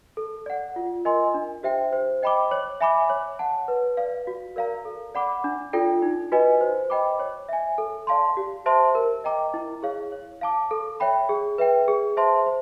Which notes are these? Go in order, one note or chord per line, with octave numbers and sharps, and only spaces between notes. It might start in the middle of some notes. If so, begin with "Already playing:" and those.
A4
D5 F#5
F4
A#4 D#5 G#5 C6
D4
G4 C5 E5 G5
C5
D#5 G5 B5 D6
C#5
E5 G#5 B5 D6
C#5
F#5 A5
B4
D5 F5
F#4
A#4 D5 F5 A#5
A4
D5 F#5 B5 D6
D4
F4 A4 D5 G5
D#4
F#4 B4 D#5 G#5
C5
D#5 G5 B5 D6
C#5
E5 G#5
A4
D5 F5 A5 C6
G4
C5 E5 A5 C6
A#4
D#5 G5 A#5 D6
E4
G#4 C#5 F5
C#5
F5 A5 D6
A4
C#5 E5 G5 B5
G#4
B4 E5 G5
G#4
C5 E5 A5 C6
C5